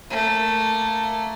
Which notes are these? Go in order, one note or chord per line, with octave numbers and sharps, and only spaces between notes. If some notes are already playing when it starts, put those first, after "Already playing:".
A3 A#3